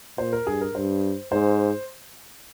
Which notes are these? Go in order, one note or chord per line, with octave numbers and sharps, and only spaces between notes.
A#2 C5
A#4
G2 G#4
A#4
G2 C5
G#2 C5